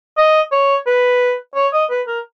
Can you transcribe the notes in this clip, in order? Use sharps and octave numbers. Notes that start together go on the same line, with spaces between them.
D#5
C#5
B4
C#5
D#5
B4
A#4